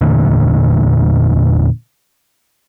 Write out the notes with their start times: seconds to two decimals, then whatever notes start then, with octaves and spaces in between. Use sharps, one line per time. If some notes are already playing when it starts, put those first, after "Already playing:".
0.01 E2 A#2 D3 A3